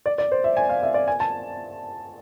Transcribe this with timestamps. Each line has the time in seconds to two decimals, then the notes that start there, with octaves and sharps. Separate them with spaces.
0.06 D5
0.18 D5
0.32 C5
0.44 E5
0.57 G#5
0.69 F5
0.83 E5
0.94 D5
1.08 G#5
1.20 A5